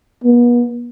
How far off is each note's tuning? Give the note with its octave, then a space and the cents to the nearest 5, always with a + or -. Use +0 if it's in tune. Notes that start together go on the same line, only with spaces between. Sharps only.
B3 -40